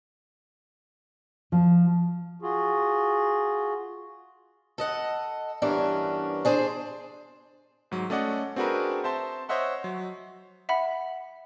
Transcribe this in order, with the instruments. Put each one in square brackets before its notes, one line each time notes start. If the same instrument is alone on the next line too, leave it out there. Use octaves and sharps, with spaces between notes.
[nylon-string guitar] F3
[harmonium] F4 F#4 G#4
[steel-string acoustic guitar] A4 D#5 F#5
G2 E3 B3 C#4 D4 A#4
D4 G#4 C5 D5
[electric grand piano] G#2 F#3
A3 C#4 D5 D#5 F#5
C4 D4 F#4 G#4 A#4 B4
C5 E5 A5 C6
C5 C#5 D#5 E5 F#5 C6
F#3
[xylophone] E5 F#5 B5